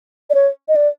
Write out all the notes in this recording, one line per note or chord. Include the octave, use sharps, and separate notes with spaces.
D5
C#5
D#5
D5